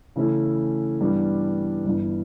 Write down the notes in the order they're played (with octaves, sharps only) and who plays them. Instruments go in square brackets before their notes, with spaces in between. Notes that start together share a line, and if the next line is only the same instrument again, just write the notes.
[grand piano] C#3 E3 A3 C#4 E4
G2 E3 G3 B3 D4
G1 G2 E3